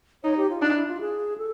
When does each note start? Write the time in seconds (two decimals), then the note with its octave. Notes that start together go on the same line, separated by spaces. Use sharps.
0.24 D#4 C#5
0.37 G4
0.50 F4
0.62 D4 D#4
0.75 E4
0.87 F4
1.00 G#4
1.38 A4